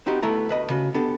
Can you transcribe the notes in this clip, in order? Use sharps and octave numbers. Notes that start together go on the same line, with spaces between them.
B3 C4 D#4 F#4 G4 F#5
D2 A3 B3 E4 A#5
D2 B4 D#5
C#3 F#4
B3 D4 G4 A4